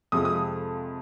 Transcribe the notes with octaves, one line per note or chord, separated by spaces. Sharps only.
F2 C3 F3 G#3 D#6
D#6